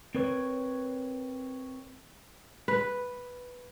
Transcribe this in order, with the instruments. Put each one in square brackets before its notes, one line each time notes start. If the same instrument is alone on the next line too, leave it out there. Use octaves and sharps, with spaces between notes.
[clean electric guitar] C4 A#4 B4 C#5
[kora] B4